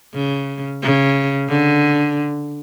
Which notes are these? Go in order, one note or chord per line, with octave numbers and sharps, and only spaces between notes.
C#3
C#3
D3